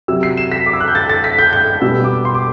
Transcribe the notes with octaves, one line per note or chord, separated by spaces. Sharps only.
C3 F#3 E6
C7
E7
B6
D6
E6
F#6
G6
A6
A6
B6
G6
G6
G6
B2 G3 E6
D6
C6
D6